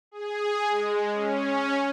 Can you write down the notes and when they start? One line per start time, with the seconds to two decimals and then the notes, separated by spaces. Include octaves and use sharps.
0.11 G#4
0.67 G#3
1.11 C#4